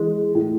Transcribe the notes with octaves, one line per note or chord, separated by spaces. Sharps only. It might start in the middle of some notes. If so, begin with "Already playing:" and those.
Already playing: E3 G#3
A2